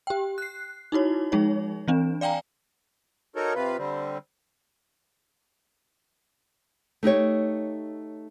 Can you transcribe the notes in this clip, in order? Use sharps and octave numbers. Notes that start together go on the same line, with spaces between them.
G4 G5
F#6 C7
D#4 E4 F#4 C#5
F3 G#3 D#4 G#4 C#5
E3 C4 D4
D5 F5 G5 G#5 A#5
D#4 F#4 A4 A#4 C#5
C3 F4 B4
D3 G3 C4
A3 D#4 G4 C#5